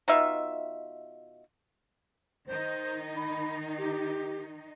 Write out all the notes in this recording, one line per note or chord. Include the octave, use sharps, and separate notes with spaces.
B2 D#4 F4 E5
D#3 D#4 C5
B5
G4